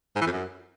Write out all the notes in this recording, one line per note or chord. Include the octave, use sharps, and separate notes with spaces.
G#2
E3
F2
F#2